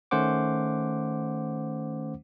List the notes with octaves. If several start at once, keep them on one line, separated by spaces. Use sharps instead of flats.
D#3 A3 C#4 C5 F#5 D6